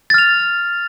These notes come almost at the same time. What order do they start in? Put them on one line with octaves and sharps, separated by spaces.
A6 F6 F7